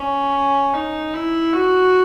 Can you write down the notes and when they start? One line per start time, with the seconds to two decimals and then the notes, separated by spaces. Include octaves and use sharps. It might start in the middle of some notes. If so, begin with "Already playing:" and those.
Already playing: C#4
0.74 D#4
1.14 E4
1.53 F#4